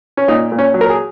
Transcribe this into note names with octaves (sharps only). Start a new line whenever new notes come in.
C#4
A#2 D#4
A#2
C#4
F#3
A#4
G#4